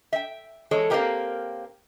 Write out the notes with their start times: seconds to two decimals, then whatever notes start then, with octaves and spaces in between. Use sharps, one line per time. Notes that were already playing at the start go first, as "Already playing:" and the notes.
0.13 E5 G5
0.71 E3 G#3 A4 C#5
0.90 A#3 C4 D#4 E4 G4 A#4